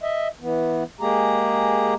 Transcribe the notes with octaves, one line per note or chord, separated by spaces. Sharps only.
D#5 E5
E3 B3
G#3 A#3 G4 G#4 A#5